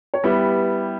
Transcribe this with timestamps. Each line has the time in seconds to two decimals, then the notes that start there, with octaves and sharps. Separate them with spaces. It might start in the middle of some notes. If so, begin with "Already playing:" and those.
0.14 C#5
0.24 G3 B3 E4 G4 B4